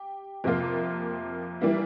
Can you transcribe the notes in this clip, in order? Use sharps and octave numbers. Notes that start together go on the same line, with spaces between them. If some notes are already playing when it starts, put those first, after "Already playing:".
Already playing: G4
F2 C3 F3 A#3 F4
E3 G3 A#3 E4